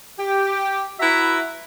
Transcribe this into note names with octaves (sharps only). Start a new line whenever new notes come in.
G4
E4 F#4 B4 E5 A#5